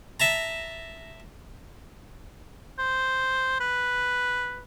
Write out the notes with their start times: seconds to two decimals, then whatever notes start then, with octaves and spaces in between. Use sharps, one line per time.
0.20 E5 A5 A#5
2.79 C5
3.60 B4